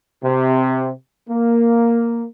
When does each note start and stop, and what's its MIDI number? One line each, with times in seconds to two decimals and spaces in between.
0.23 0.91 48
1.29 2.24 58